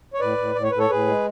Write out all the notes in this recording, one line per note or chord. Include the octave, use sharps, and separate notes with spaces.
C#5
A2 B4 D5
A2
A2 D5
C#5
A2 B4
A4 C#5
A2 G#4 B4
G#3